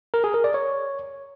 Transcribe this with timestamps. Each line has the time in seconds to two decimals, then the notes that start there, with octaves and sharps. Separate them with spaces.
0.14 A#4
0.24 G#4
0.34 A#4
0.44 D5
0.54 C#5